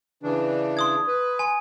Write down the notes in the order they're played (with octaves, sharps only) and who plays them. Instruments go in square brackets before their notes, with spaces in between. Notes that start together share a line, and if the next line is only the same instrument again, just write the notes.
[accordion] C#3 E3 D4
[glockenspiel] C6 D#6 G#6
[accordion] B4
[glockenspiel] G#5 C6